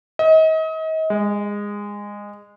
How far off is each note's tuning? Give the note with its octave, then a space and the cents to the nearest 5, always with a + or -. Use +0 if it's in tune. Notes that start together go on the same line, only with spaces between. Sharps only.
D#5 +35
G#3 -20